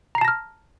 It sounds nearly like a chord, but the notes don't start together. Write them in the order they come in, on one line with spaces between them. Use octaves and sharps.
A#5 C7 A5 A#6 F6